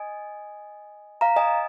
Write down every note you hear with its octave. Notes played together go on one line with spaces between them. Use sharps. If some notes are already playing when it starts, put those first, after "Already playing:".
Already playing: D#5 G#5
F5 A#5
D#5 G#5